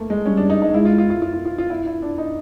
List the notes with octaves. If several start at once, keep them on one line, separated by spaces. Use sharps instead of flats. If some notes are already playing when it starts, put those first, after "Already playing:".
Already playing: A3 A#3
G#3
G3 C#4
D4
D#4
D#4
G#3 E4
F4
F4
F4
F4
F4
F4
F4
E4
E4
D4
D#4